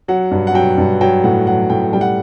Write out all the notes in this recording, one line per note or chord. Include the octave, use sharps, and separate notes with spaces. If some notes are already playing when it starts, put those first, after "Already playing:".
F#3 F#5
G2
F#5
F#3 G5
G2
F#3 G5
A2 F#5
F#3 F#5
A2 G5
G3 G5
F#5